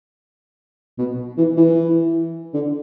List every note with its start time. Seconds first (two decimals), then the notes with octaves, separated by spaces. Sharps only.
0.98 B2
1.37 E3
1.57 E3
2.54 D3